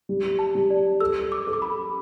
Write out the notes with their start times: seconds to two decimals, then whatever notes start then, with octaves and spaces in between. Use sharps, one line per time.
0.09 G3
0.39 A5
0.55 G3
0.70 D5
1.00 A4 E6
1.32 D6
1.47 A4
1.53 D6
1.62 B5